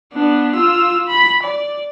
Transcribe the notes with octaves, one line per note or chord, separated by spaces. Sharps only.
B3 D4
F4 E6
B5
D5